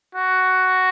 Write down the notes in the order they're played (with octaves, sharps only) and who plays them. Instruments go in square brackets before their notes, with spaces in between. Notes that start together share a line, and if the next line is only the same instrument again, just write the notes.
[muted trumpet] F#4